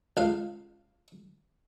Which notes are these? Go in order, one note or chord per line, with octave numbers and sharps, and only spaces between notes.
C#2 F5